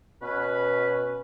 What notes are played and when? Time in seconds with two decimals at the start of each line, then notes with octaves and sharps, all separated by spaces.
0.22 B2 C#4 B4